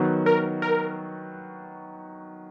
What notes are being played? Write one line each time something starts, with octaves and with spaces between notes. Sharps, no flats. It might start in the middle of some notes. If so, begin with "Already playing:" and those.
Already playing: D#3 F#3 B3 F#4
A#4
A#4